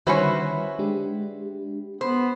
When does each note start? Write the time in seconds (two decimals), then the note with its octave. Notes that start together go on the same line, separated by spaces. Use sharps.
0.07 D3 D#3 G3 C#4 E4 F#4 B4 C5
0.79 G#3 D4 G4
2.01 B3 C5 B5